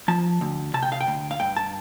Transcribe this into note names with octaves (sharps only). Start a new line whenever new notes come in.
F3 A5
D2
C3 A5
G5
F5
G5
D2
F5
G2 G5
A5